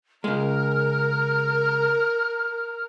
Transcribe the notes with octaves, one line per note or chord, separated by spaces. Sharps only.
C#3 G#3 A#4 F6